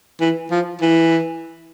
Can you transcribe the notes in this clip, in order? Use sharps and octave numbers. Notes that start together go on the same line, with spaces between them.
E3
F3
E3